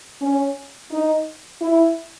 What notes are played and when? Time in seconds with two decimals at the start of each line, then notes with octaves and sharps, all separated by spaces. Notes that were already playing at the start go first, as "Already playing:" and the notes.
0.22 C#4
0.91 D#4
1.61 E4